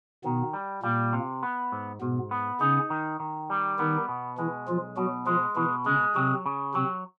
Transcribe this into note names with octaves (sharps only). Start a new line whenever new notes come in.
B2 D#3 B3
G3
A#2 G3 A#3
C3
B3
G#2
G#2 B2 B3
B3
C#3 C#4 D#4
D#3
D#3
G3
D#3 B3 D#4
B2
E3 G#3 E4
B1 F3 F4
B2 F#3 F#4
F3 G#3 F4
B2 E3 E4
C#3 G#3 C#4
C3 F#3 C4
C#3
C3 F#3 C4